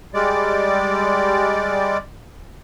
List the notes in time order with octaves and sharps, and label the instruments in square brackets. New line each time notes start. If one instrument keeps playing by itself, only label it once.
[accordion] G3 G#3 D5